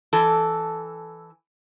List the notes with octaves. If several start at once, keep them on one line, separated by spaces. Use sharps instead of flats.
E3 A4